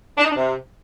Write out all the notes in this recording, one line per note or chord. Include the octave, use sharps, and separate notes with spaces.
D4
D#4
D4
C3